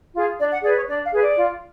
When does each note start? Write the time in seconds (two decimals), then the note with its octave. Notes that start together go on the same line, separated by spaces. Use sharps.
0.15 F4 G#4
0.39 D4 D5
0.51 F#5
0.63 G#4 B4 D5
0.76 C#5
0.88 D4 D5
1.04 F5
1.12 G#4 B4
1.20 D5
1.37 F4